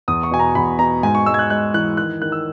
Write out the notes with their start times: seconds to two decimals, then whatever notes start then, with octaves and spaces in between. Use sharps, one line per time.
0.08 E2 D#6
0.23 C#6
0.31 B2 G#5
0.39 A#5
0.55 E2 B5
0.79 B2 A#5
1.03 G#2 G#5
1.15 C#6
1.26 G#3 E6
1.34 G#6
1.39 F#6
1.50 G#3 F#6
1.74 E3 F#6
1.97 D#3 F#6
2.22 D#3 F#6
2.32 E6